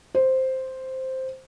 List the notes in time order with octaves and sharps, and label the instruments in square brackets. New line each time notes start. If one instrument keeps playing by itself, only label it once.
[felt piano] C5